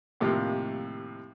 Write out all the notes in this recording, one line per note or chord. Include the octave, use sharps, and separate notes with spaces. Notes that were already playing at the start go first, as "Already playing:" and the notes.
D#2 A2 C3 F3 A#3